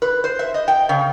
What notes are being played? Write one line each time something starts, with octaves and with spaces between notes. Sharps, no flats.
B4
C5
E5
D#5
G5
C#3